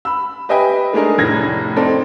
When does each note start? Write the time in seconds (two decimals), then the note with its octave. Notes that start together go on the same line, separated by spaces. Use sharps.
0.05 B5 E6
0.49 G4 B4 D#5 E5 G5 G#5
0.93 G#3 A3 D4 D#4 G#4 A#4
1.18 F1 A2 G#6 A#6
1.76 C4 D#4 A4 C5 D5